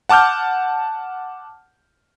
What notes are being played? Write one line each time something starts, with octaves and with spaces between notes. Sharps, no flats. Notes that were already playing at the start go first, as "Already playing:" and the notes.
F#5 A5 D6 F6 G6